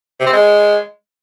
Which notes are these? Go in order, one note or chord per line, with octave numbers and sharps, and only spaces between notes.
C3
C4
G#3